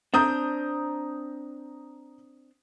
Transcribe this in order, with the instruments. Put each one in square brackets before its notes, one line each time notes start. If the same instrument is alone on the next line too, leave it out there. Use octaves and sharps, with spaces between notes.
[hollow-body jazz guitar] C4 D4 [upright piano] A#5 D#6 G6